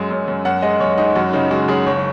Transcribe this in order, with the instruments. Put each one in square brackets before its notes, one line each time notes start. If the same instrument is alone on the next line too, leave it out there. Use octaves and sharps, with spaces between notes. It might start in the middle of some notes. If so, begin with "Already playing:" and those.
Already playing: [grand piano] F#2 F#3 G#3 G#5
F#2
F#2
F#2 F#5
G#3 D#5
F#2 C#5
G#3 D#4
F#2 F#4
C#3 D#4
G#3 F#4
F#2 G#4
F#1 C#5